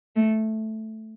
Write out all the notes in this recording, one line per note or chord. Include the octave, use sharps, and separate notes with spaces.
A3